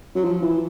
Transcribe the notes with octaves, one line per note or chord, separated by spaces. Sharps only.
F#3
F3
E3